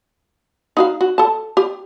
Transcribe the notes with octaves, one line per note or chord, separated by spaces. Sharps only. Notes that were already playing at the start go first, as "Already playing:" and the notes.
D#4 F#4 F5
F#4
A4 A5
G4